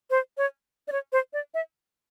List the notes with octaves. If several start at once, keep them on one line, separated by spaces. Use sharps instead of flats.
C5
C#5
D5
C#5
C5
D5
E5